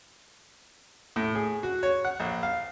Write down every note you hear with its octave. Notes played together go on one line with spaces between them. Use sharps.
A2
G#4
F#4
C#5
F#5
A#1
F5